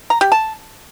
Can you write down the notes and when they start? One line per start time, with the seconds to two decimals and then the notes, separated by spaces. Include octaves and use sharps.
0.10 A#5
0.21 G4
0.32 A5